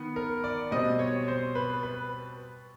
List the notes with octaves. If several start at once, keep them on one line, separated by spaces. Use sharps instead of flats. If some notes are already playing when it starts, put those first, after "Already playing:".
Already playing: D#3 B3
A#4
D5
B2 G3 C4 D#5
C#5
C5
B4
B4